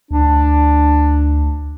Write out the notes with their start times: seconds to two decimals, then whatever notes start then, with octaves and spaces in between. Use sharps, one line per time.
0.11 D2 D4